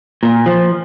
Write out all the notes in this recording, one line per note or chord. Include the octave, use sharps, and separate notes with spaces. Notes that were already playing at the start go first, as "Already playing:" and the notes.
A#2
F3